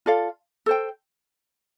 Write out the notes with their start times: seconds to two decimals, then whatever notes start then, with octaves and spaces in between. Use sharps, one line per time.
0.06 F4 A4 D5 F5
0.66 A4 C5 G5